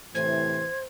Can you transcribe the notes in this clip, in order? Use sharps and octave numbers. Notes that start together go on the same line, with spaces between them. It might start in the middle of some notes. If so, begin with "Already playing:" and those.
A2 C3 E3 C5 G#6